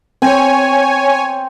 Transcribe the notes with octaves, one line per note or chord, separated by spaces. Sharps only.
C4 C#5 G#5